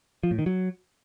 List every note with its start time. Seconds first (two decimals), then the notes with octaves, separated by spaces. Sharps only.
0.23 F3
0.31 A2
0.39 D#3
0.46 F#3